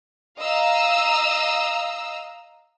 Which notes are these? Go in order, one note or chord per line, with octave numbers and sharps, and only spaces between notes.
D#5 F5 A#5 E6